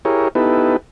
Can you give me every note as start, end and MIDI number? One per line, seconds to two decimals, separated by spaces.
0.05 0.28 64
0.05 0.28 67
0.05 0.28 68
0.05 0.28 70
0.05 0.28 73
0.35 0.77 59
0.35 0.77 63
0.35 0.77 64
0.35 0.77 67
0.35 0.77 69
0.35 0.77 71